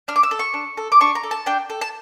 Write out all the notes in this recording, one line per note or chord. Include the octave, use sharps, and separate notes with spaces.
D4 F6
D6
E6
A4
C#6
D4
A4
D6
D4 C#6
A#5
A4
A5
D4 G5
A4
A5